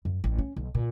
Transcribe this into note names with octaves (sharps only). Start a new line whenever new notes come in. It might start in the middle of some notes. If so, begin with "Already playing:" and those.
F#2
A1
C#4
B1
A#2